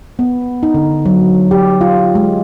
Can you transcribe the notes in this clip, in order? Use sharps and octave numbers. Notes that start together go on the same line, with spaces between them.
B3
D#4
D3
F#3
G4
F4
G#3